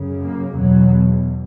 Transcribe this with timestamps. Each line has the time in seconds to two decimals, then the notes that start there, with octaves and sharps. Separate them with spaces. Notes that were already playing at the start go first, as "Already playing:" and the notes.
Already playing: F#2 C#3
0.23 A#3
0.58 E2 B2 F#3